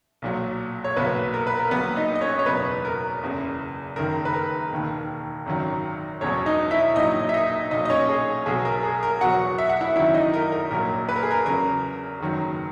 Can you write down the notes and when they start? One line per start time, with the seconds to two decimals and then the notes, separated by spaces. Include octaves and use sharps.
0.22 B1 A#2 F#3
0.84 C#5
0.96 B1 A#2 F#3 B3 B4
1.34 A#4
1.47 B4
1.59 A#4
1.71 A#1 A#2 F#3 B3 B4
1.97 D#4 D#5
2.15 D#5
2.21 C#4 C#5
2.39 C#5
2.46 F#1 E2 B2 F#3 B3 B4
2.85 A#4
3.22 F#1 E2 C#3
3.96 F#1 F#2 D#3 A#4
4.25 B4
4.34 A#4
4.72 E1 D#2 D#3
5.46 G#1 F#2 D#3 F#3
6.21 E1 E2 B2 F#3 C#4 C#5
6.46 D#4 D#5
6.71 E4 E5
6.96 A#1 A#2 F#3 D#4 D#5
7.29 E5
7.34 D#4 D#5
7.71 B1 A#2 F#3 D#4 D#5
7.85 D#5
7.90 C#4 C#5
8.09 G#4
8.46 B1 B2 F#3 G#4
8.65 A#4
8.83 G#4
9.03 A#4
9.21 E2 B2 F#3 F#4 F#5
9.58 E5
9.69 F#5
9.81 E4 E5
9.96 G#1 F#2 D#3 F#3 E4 E5
10.14 D#4 D#5
10.34 A#4
10.52 A#4
10.71 A#1 A#2 F#3 A#4
11.09 B4
11.16 A#4
11.23 G#4
11.31 A#4
11.46 E2 C#3 F#3 A#4
12.20 F#1 F#2 D#3 F#3